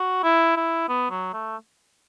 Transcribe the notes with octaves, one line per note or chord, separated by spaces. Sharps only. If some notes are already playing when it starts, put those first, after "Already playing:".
Already playing: F#4
E4
E4
B3
F#3
A3